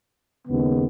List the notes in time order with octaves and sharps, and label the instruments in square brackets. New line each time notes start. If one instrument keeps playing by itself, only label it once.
[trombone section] D#2 C#3 G#3 B3